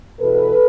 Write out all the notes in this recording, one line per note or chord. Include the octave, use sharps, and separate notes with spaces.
E2 B2 A4 B4